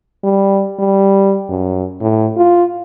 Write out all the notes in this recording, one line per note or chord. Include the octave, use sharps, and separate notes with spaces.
G3
G3
F#2
A2
F4